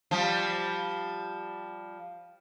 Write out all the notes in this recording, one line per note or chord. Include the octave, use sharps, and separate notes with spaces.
F3 G3